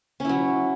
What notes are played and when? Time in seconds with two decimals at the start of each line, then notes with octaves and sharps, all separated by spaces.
0.20 C#4
0.25 E4
0.29 F#3